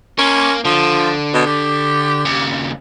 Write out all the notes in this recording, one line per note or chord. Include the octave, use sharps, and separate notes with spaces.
A#3 C#4
D3 F3
B2
G4
D#2 C#3